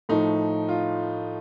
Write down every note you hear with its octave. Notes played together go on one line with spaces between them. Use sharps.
A2 F3 A3 D#4
F4